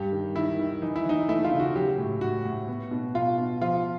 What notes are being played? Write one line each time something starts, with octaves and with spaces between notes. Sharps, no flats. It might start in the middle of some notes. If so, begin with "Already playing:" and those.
Already playing: G2 G4
D#3
D#3 E4
D#3
E3 D#4
E4
E3 D#4
A3 E4
F4
C#3
F#4
F#3 G4
A2
A2 F#4
A2
B3
B2
B2 F4
B2
F3 F4